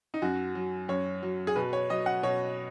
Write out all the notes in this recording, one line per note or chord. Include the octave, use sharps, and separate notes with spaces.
D#4
F#2 F#4
F#3
F#2 C#5
F#3
G#4
B2 B4
C#5
F#3 D#5
F#5
B2 C#5